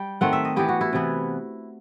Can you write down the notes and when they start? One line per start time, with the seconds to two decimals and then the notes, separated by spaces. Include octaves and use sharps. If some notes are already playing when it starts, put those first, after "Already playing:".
Already playing: G3 G5
0.21 D#3 A3 C4 F#5
0.33 E5
0.45 D#5
0.56 E3 B3 G4
0.69 F#4
0.81 E4
0.93 C3 E3 B3